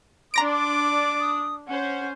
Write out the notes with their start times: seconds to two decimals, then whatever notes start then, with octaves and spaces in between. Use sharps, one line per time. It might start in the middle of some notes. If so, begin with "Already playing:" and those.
0.34 D4 D5 A#5 C6 D6 A#6 D7
1.20 D#6
1.67 C#4 C5 F#5